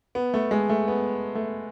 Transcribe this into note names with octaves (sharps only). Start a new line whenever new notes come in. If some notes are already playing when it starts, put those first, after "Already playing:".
B3
A3
G#3
A3
B3
A3